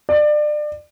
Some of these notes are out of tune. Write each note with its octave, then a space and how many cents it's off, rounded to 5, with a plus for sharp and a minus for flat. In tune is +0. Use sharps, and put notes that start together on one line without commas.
D5 +30